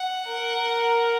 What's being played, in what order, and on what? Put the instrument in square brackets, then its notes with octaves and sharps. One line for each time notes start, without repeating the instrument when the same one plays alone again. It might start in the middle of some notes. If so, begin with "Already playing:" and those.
Already playing: [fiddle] F#5
[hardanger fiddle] A#4